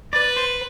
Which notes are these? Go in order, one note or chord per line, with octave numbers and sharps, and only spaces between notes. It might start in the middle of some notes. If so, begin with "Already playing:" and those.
B4 D5
C5